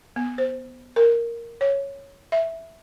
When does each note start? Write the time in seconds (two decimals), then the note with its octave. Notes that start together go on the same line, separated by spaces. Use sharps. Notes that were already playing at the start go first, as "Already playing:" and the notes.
0.16 B3
0.38 C5
0.96 A#4
1.61 C#5
2.32 E5